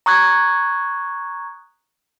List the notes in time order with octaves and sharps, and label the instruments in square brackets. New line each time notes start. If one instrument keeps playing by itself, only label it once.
[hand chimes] A#5 C#6 D#6 F#6 G#6